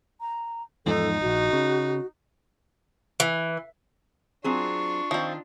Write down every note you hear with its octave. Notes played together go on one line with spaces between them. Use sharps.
A#5
E2 G#2 F3 D#4 A4
D1 A#1 F#4
C#3
E3
F#3 C4 D4 F4 G#4 C#6
D#3 F3 C4